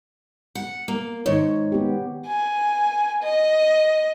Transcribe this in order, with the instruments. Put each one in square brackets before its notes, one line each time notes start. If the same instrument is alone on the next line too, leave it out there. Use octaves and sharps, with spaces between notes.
[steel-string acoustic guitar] F#5
A#3
[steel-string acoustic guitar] G#2 [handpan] D#3 C#5
[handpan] B3 G4
[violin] G#5
D#5